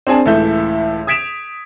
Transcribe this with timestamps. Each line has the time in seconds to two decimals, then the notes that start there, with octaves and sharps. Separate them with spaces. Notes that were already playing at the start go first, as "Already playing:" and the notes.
0.07 C4 D4 G#4 G#5 A5
0.25 C#2 A2 E3 A4 E5 G6
1.07 D#6 G#6 B6 D7 E7 F7